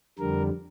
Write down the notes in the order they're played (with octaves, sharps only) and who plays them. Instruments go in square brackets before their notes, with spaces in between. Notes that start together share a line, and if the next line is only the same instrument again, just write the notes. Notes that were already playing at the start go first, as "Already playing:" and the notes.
[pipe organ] F2 D3 G3 A#4